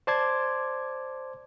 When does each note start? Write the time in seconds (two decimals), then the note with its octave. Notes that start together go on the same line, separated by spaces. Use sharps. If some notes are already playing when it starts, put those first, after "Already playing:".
0.07 C5 D5 A5 C6 D6 G#6